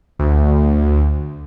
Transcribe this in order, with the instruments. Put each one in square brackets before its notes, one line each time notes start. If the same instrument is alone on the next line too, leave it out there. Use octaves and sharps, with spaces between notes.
[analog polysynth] D2